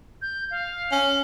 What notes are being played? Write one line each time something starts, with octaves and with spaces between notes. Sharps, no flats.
G6
F5
C#4